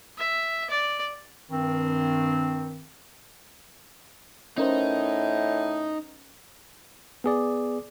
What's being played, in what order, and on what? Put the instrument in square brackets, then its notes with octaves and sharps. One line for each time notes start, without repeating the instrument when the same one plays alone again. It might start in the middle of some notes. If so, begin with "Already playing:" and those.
[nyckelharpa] E5
D5
[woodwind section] G2 D#3 C4
[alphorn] A2 [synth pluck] C#4 A#4 C5 [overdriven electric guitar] D#4
[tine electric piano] B3 G#4 D5